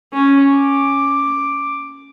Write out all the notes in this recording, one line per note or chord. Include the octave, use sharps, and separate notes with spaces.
C#4
D6